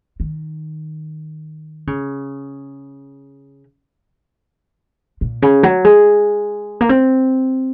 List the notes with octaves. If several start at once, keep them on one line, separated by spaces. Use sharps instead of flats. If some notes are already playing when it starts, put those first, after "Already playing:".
D#3
C#3
A#2
C#3
F#3
G#3
A#3
C4